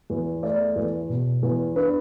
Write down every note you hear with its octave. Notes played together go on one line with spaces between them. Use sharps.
E2
A3 D5
E2
B2
E2
D4 B4